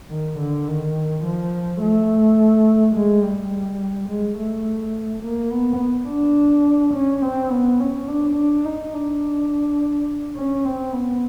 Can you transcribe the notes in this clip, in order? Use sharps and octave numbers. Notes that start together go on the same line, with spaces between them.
D#3
D3
D#3
F3
A3
G#3
G3
G#3
A3
A#3
B3
D4
C#4
C4
B3
C#4
D4
D4
D#4
D4
C#4
C4
B3